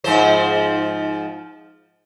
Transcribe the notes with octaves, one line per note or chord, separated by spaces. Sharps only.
G#2 F3 C5